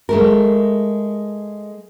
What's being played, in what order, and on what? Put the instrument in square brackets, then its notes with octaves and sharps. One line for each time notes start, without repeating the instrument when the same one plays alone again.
[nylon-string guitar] G#3 A3 A#4